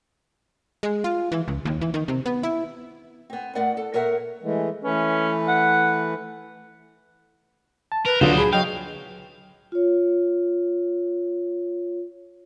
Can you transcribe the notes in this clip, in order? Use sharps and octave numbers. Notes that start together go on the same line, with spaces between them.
G#3
F4
E3
C#2
D#2
E3
D#3
C3
B3
E4
B3 C4
A2 B3 A#4 D5 F#5
A4
A#2 A#4 C#5 E5 F#5
E3 G#3 A3
E3 A3 C#4 B4
F#5
A5
A#4 B4
C#2 A#2 D3 F#3 F4 C5 D#6
G#4 B5
F#3 D#5 F5 G5
F4 C#5